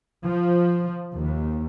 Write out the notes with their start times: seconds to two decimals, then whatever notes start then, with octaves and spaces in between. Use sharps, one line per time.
0.25 F3
1.14 D#2